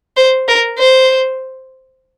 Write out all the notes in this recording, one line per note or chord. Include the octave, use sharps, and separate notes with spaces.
C5
A#4
C5